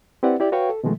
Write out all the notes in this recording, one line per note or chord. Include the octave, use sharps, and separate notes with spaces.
C4 E4 G4 B4 D5 F#5
E4 G4 D5
F#4 B4 C#5 F5 G5 C#6
A4
B2 D#3 F3 G#3 A3